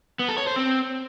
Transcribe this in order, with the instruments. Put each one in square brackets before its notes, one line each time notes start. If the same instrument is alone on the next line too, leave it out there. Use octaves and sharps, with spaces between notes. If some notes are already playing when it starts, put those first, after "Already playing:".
[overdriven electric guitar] B3
A4
C#5
C5
C4